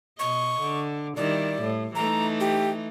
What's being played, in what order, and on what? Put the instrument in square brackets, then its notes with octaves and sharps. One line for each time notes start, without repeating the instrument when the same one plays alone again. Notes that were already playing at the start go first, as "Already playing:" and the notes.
[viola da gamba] B2 D#5 [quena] C#6
[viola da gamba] D3
[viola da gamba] D#3 G3 E4 [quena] D5
[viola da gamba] A2
[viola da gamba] E3 A3 D#4 [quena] A#5
[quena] G4